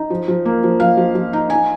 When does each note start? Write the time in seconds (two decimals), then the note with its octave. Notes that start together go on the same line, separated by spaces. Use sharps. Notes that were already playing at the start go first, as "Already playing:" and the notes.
Already playing: D#4
0.10 F3
0.28 F3
0.45 A#3
0.63 F3
0.80 F3 F5
0.97 F3
1.15 F3
1.33 D#4
1.50 D#4 G#5